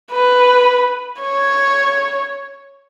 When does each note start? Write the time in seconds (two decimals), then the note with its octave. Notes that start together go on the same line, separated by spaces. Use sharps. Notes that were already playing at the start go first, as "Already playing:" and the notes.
0.12 B4
1.22 C#5